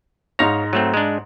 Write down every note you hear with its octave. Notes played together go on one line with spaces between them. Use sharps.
G#2 D#4 C#5 F5 A#6
F#3 A3 C4
G#3 D4